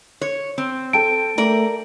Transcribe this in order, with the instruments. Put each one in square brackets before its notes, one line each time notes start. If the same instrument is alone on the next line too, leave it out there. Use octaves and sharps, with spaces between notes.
[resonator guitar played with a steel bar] C#5
C4
[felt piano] A4 G5 A5 [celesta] D7
[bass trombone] A3 [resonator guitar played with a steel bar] A#4 D5